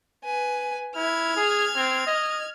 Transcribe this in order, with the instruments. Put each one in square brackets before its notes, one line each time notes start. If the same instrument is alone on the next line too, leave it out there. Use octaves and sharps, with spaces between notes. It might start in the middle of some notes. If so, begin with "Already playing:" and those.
[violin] B4 G#5
[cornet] E4 [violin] F6 G#6
[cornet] G#4
C4
D#5